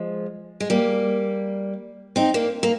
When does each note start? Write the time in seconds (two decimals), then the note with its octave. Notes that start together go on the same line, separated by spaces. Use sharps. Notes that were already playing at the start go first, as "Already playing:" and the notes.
Already playing: F3 G#3
0.60 G#3
0.70 G3 A#3
2.16 C4 D#4
2.34 A#3 D4
2.63 A#3